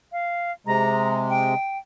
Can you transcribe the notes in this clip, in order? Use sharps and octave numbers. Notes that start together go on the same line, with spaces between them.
F5
C3 G#3 A#5
G5